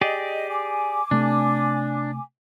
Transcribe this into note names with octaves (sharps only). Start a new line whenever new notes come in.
G4 G#4 D5 D#5
G#5 D6
C3 A3 D4